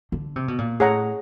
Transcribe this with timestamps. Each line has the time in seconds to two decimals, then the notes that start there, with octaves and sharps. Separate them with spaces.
0.12 D3
0.36 C3
0.48 B2
0.58 A#2
0.80 A2 G#4 C#5 F#5 A#5